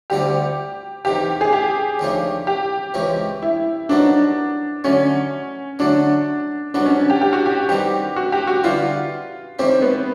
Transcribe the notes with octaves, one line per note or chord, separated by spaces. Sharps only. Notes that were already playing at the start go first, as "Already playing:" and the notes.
D2 D3 G3 C4 F4 G4
E2 C3 D#3 G4
G#4
G4
D#2 C#3 F3 A3 D4
G4
C#2 C3 E3 G#3 C#4
E4
C2 A#2 F#3 B3 D4 D#4
D3 F#3 A3 C#4
D3 F#3 A3 D4
C2 B2 F#3 B3 D4
C#4
G4
G4
F#4
G4
C2 C3 D#3 G3 B3 G4
F#4
G4
F#4
D3 G3 B3 E4 F4
D#3 G#3 C4 C#4 E4 G4
B3